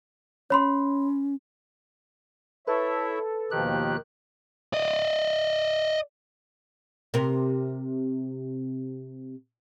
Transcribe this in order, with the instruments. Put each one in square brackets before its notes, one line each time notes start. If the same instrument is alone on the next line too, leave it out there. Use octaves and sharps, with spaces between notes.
[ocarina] C#4 [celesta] C#5 B5 C6
[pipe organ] E4 [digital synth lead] A4 [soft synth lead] B4 [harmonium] C#5 E5
[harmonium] D#2 B2 F3 [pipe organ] D#3 G4 F#6
[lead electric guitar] D5 D#5
[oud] C3 A#4